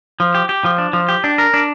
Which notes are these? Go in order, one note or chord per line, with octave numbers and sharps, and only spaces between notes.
F3
G4
G4
F3
D4
F3
G4
D4
A#4
D4